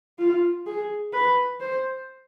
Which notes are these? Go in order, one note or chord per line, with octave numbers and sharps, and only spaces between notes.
F4
G#4
B4
C5